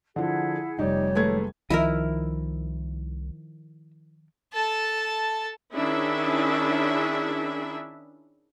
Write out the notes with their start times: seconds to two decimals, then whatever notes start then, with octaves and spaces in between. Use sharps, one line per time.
0.16 D3 F3 E4 G#4 F#5
0.79 F1 G3 D#4 C#5 D5
1.15 D#3 G#3 A3 A4 B4 G#6
1.70 C2 D#3 F3 E4 A#4 D#5 E5
4.53 A4 A5
5.75 D#3 C#4 D4 E4 G#4 E5